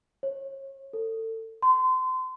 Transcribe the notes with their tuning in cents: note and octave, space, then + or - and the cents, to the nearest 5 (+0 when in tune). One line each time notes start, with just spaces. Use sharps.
C#5 -30
A4 +30
C6 -30